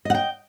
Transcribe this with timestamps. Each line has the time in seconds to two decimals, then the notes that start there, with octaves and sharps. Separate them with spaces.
0.05 D#5
0.10 F#5
0.15 G5